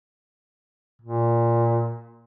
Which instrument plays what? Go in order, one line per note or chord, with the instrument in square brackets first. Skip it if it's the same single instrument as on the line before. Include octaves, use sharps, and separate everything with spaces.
[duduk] A#2